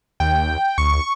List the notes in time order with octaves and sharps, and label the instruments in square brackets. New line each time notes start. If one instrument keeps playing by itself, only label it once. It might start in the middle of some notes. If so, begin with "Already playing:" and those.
[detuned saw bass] D#2 [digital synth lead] G5
[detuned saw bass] D2 [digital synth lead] C#6